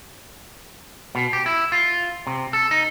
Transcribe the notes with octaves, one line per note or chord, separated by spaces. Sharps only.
B2
G4
E4
F4
C3
A4
D#4